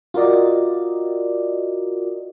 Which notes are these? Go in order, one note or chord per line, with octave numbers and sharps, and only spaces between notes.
F4 F#4 A#4 D5 D#5